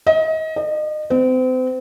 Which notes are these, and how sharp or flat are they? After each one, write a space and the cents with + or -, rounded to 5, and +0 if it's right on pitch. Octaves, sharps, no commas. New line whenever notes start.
D#5 +30
D#5 -35
C4 -35